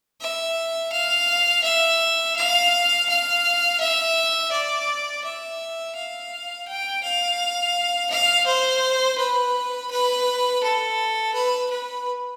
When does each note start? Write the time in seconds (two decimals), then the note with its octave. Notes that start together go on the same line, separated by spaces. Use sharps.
0.21 E5
0.92 F5
1.64 E5
2.36 F5
3.09 F5
3.80 E5
4.52 D5
5.24 E5
5.96 F5
6.68 G5
7.03 F5
8.11 F5
8.46 C5
9.18 B4
9.91 B4
10.63 A4
11.34 B4
11.70 B4